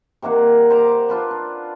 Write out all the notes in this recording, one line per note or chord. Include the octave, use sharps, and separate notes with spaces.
C3 D#3 A#3 F#5
C5 A#5 D6
D4 F4 B4 D5
D4